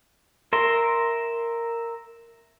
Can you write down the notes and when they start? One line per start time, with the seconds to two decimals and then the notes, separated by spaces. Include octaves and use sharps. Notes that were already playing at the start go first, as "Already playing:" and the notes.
0.53 A#4 E5 C6